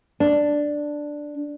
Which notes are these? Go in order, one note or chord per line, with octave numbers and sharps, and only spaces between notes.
D4